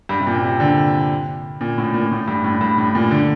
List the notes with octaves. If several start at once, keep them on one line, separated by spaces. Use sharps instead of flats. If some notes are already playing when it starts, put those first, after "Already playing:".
G2
C3
A#2
C3
D3
A#2
A2
A#2
A#2
A2
G2
A2
G2
A2
A#2
D3